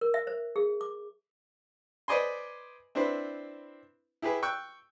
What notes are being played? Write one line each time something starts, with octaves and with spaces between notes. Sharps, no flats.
A#4
E5
C5
G#4
D6
B4 C5 D5 D#5 G#5 C6
C4 D4 E4 B4 C5
E4 G4 G#4 B4
G5 C#6 E6 F#6